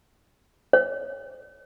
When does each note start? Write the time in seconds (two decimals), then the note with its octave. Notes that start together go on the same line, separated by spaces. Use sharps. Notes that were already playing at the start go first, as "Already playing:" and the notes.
0.73 C#5